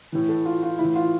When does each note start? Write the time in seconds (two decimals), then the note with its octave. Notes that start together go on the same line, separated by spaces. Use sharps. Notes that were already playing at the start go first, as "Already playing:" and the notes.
0.12 A2 E3
0.29 A4
0.45 F4
0.63 F4
0.79 A2 E3 E4
0.95 F4